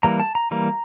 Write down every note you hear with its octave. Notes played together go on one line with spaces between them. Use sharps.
E3 G3 A#3 A#5
A5
A#5
E3 G3 A#3 A#5